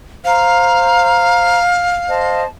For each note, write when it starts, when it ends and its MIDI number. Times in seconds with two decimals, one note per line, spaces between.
0.24 1.58 72
0.24 2.41 77
0.24 1.58 82
2.08 2.45 72
2.08 2.45 75
2.08 2.45 81